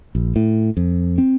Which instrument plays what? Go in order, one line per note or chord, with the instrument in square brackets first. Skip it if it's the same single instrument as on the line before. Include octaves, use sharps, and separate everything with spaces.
[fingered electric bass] A#1
A2
F2
C4